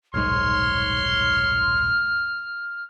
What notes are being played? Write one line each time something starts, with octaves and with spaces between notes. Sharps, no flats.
D#1 B1 G#2 C#5 C6 F6